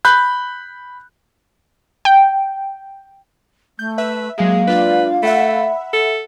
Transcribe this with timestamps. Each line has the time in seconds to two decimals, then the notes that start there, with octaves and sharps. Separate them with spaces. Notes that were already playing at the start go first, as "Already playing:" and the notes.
0.05 B5 F#6 G6
2.05 G5
3.79 A3 G6
3.98 B4 E5
4.38 F#3 G#3 A#3 G#4 F5
4.67 D4 F4 B4 D5
5.23 A3 E5 F#5 B5
5.93 A4